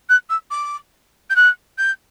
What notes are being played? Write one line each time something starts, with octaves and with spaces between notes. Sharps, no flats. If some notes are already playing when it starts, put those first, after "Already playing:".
F#6
E6
D6
G6
F#6
G6